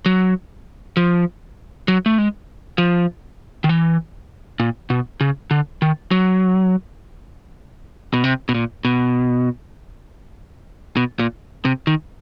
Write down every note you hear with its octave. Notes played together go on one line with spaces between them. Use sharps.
F#3
F3
F#3
A3
G#3
F3
D#3
E3
A#2
B2
C#3
D3
D#3
F#3
B2
C3
B2
A#2
B2
B2
A#2
C3
D#3